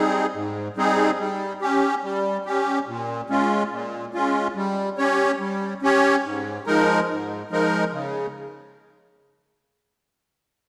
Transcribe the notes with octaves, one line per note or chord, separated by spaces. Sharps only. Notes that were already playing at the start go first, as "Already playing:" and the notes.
Already playing: G3 C4 D#4 G#4
G#2
G3 C4 D#4 G#4
G3
C#4 G4
G3
C#4 G4
A#2
G#3 C#4 F4
A#2
G#3 C#4 F4
G3
C#4 G4 C#5
G3
C#4 G4 C#5
G#2
F3 G#3 D#4 A#4
G#2
F3 G#3 D#4 A#4
C#3